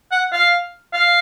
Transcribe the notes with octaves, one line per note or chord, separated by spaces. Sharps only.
F#5
F5
F5